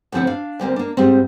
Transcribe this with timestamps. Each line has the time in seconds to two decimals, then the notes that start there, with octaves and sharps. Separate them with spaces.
0.12 D2 A2 F3 C4 E4 F#5
0.27 D4 F5
0.59 D2 G3 A#3 C4
0.76 A#3 D4
0.97 G#2 G3 C4